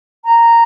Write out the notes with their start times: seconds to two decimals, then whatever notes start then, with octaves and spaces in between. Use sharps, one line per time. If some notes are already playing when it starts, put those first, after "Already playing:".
0.24 A#5